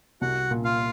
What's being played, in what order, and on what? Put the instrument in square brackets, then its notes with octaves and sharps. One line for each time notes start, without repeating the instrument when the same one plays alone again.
[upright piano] C2 [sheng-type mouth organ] F#4 F#5
[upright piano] A#2
[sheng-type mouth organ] F4 F5